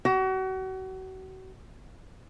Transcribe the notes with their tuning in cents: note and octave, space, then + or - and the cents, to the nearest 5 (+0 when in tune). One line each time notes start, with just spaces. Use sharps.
F#4 +35